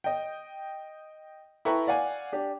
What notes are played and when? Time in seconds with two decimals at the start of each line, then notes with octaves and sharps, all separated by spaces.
0.04 D#5 G5
1.65 E4 A4 B4 G5 A#5 C#6
1.87 D5 F5 F#5 G#5
2.32 D4 G4